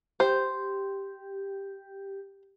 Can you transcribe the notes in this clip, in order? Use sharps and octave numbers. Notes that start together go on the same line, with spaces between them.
G4 C5